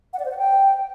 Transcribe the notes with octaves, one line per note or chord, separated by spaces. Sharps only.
F#5
D5
C5
F#5
G5